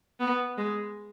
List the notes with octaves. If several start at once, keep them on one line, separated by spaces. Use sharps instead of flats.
B3
G#3